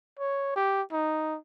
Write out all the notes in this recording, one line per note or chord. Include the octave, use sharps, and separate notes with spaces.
C#5
G4
D#4